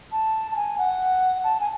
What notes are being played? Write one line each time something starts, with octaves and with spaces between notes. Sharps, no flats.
A5
A5
G#5
F#5
A5
G#5